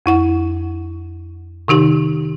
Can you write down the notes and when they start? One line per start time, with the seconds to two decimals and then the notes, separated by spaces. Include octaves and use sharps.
0.06 F2 E4 F#5
1.68 C3 D#3 D#4 G4